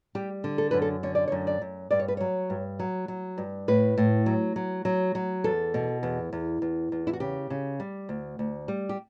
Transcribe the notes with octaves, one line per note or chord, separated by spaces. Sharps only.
G3 G4
D3
A4
F#2 B4
A4
D3 C#5
D5
C#5
F#2
D5
F#2
G2 D5
C#5
B4
F#3 C#5
G2
F#3
F#3
G2
A2 B4
A2
F#3
F#3
F#3
F#3
E2 A4
B2
E2
E2
E2
E2
E4
F#4
C#3 G4
C#3
G3
D2
D2
G3
G4